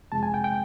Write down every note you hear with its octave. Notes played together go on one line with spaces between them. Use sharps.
F2 C3 F3 G#3 A5
G#5
G5
G5